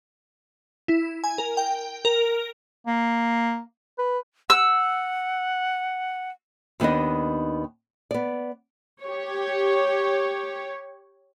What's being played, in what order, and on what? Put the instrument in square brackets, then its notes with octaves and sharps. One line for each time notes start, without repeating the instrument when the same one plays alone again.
[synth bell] E4
G#5
A#4
G5
A#4
[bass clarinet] A#3
B4
[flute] F#5 [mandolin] E6
[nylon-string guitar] D#2 D#3 B3 D4 D#5
B3 D5
[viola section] G4 C#5